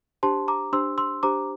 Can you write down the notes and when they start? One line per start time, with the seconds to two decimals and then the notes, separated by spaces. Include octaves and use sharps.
0.23 D4 G4 C5 A5 C6
0.48 A#5 D6
0.72 D4 G4 C5 C6 E6
0.98 C6 E6
1.23 D4 G4 C5 A#5 D6